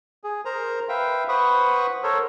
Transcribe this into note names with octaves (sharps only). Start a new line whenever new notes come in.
G#4
A#4 C5 A#5
B4 E5 F5 G5
B4 C5 F#5 B5 C#6 D#6
A4 A#4 C5 C#5